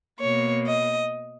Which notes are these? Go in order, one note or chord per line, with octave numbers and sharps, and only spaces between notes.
B2 A#3 C#5
D#5